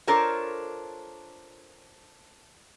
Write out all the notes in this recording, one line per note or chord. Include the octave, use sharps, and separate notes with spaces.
D4 F4 A4 A#4 C5 C#5